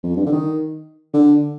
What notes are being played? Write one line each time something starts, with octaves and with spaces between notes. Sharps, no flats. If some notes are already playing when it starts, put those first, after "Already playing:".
F2
G2
D3
D#3
D3